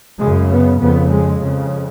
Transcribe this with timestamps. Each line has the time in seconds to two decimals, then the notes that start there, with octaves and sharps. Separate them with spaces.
0.19 F#2 C#3 G#3
0.50 B3
0.79 F2 C#3 B3
1.10 G#3
1.40 F2 C#3